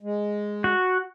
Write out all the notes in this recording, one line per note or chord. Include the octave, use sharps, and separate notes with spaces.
G#3
F#4